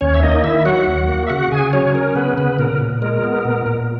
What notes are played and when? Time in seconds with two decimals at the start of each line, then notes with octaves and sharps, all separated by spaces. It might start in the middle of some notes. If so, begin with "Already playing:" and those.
0.01 D#2 C#4 C#5
0.14 E5
0.22 A#3 D#4 D#5
0.44 D#3 E4 E5
0.65 F#3 F#4 F#5
0.87 D#2
1.09 A#3
1.27 E5
1.30 C#3 F#4 F#5
1.51 C#3 G#4 G#5
1.73 F#3 C#4 C#5
1.94 C#4 A#4
2.15 C#3 B3 B4
2.37 C#3 B3 B4
2.59 A#2 A#4
2.80 A#2
3.02 G#3 A#4
3.24 B3
3.45 A#2
3.66 A#2